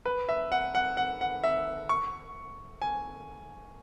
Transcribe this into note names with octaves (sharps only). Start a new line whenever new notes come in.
B4
E5
F#5
F#5
F#5
F#5
E5
C#6
G#5